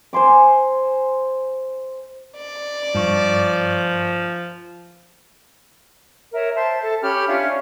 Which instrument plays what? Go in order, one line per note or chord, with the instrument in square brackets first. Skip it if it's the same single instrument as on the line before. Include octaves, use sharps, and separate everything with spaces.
[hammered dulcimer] C5 G#5 C6 D6
[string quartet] D5
[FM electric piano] G2 C#6 [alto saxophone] F3
[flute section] A#4 C#5 E5
C5 E5 A5
A4
C#4 G4 B5 F6
C#4 D4 F4 E5